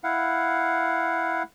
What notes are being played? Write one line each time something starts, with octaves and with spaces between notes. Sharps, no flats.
E4 F5 F#5